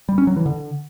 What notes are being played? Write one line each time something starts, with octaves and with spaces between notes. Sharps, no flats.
G3
C#4
F#3
E3
D3